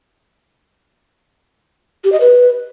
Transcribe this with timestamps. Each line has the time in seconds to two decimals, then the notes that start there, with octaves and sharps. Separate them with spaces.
2.04 G4
2.12 D#5
2.21 B4